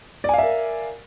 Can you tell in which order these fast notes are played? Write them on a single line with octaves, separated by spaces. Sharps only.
D5 G#5 F5 E5 A#4